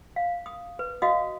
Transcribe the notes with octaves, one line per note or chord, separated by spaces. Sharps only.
F5
D#6
B4
F#4 D#5 F5 D#6